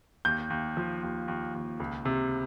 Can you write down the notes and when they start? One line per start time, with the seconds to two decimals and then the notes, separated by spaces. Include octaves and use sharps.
0.25 D#2 G6
0.50 D#2
0.77 F3
1.03 D#2
1.28 D#2
1.54 D#2
1.80 C#2
2.05 C3